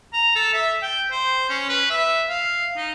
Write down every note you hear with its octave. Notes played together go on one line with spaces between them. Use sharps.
A#5
A4
E5
G5
C5
C#4
B4
E5
F5
D#4